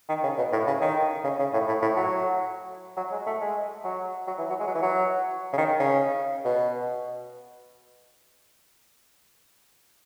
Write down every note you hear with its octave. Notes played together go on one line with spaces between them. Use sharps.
D#3
C#3
B2
A2
C#3
D#3
C#3
C#3
A2
A2
A2
F#3
F#3
G#3
A3
G#3
F#3
F#3
E3
F#3
G#3
F#3
E3
F#3
C#3
D#3
C#3
B2